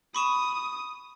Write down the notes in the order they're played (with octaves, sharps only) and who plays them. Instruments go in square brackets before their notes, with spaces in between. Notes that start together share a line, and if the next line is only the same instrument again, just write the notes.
[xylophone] B5 C#6 E7 [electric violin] D#6